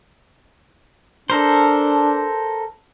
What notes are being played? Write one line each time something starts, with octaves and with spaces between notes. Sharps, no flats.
D4 A4 A#4 C5